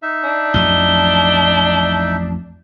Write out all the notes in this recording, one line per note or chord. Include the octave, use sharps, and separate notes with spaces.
D#4 E5
D4
A1 F2 F#3 G7